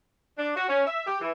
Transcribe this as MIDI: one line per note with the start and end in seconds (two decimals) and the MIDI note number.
0.37 0.54 62
0.55 0.63 66
0.68 0.84 61
0.86 1.05 76
1.06 1.20 67
1.21 1.31 52